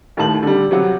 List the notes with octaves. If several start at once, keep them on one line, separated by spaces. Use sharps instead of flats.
D#2 A2 D#3 A5 F#7
D3 G3
C3 F#3 F#5